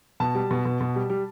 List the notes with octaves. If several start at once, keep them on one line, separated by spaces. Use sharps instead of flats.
B2 A5
G3
B2
B2
B2
G3
G3